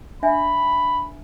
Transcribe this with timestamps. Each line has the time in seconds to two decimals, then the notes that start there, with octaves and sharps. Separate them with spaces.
0.23 D4 E5 G#5 B5